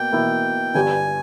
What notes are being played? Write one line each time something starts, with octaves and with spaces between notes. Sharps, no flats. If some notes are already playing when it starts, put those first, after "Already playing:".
Already playing: B2 A#3 G5
B2 A#3 E4
G1 G2 G3 G#5